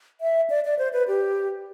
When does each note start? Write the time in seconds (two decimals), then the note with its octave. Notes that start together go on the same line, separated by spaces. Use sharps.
0.21 E5
0.50 D5
0.65 D5
0.79 C5
0.93 B4
1.08 G4